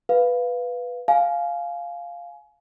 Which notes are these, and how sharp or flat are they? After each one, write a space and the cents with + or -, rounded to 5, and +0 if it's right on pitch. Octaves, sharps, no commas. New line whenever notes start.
B4 +0 F5 +0
F5 +0 G#5 +25